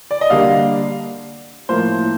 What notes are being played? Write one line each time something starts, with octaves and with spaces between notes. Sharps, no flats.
D5
D#5
D3 G3 A#3 D4 F5
A2 F3 A#3 C5